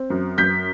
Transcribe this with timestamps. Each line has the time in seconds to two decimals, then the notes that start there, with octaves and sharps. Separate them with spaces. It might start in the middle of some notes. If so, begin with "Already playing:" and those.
Already playing: C4
0.10 F#2
0.38 F#2 G6 B6